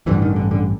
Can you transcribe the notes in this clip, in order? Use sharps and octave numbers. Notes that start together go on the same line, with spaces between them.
A1 G2 D3 E3
D#3
D3
D3